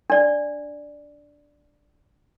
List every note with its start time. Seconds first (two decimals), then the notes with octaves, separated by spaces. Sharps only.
0.10 D4 D5